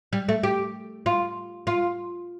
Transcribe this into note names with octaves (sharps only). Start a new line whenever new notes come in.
G3
A3
G4
F4
F4